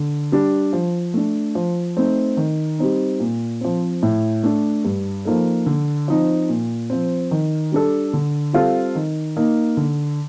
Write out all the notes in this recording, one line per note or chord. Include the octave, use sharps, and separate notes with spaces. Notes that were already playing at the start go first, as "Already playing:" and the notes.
Already playing: D3
G3 D4
F3
A3 D4
F3
A3 C4 D#4
D#3
G3 C4 D#4
A#2
F3 C4
A2
A3 D4
G2
F3 A#3 D#4 A4
D3
F3 C4 D#4
A#2
F3 C4
D#3
G3 D4 A4
D3
G3 C4 F4 A4
D#3
A#3 D#4
D3